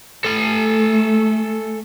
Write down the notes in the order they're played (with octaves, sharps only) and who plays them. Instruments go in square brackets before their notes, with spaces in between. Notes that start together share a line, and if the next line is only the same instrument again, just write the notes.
[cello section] A3 [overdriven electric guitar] A4 G#5